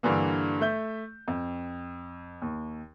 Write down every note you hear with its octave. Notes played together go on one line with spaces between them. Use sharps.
G2 D3 E3 A#3
A3 E5 G6
F2
D#2